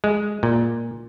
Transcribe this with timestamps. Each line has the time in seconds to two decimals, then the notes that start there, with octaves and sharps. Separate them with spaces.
0.04 G#3
0.43 A#2